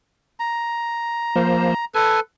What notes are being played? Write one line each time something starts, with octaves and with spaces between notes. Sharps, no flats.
A#5
F3 A#3 C5
A4 B4 G#5